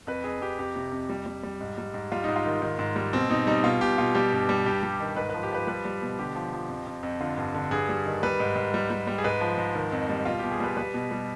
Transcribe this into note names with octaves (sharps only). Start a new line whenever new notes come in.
F2 B4
F2 G#4
F2 G4
F2 G4
C3
F2
G3
G3
G3
G#2
G3
G#2
G3 F4
G#2 D#4
F4
D#3
D#3
G#2
G3
B2 C4
B2 D#4
G3 D#4
B2 F4
B2 G4
B2 F4
G3 G4
G2
G3
G2 G4
G3
D#3
G#2 B4
F3 B4
G4
F3 B4
G3 B4
G3
B2
D3 G4
F3
F3
F2
F2
F2
D3 F4
G2
D3
G2 G#4
G3
D#3
G3 B4
G#2
G#2
G3
G3
G3
G#4
G#2 B4
F3
G#2
D#3
F2
G3
B2 F4
B2 G4
G#4
G3 B4
G3 B4
B2
G3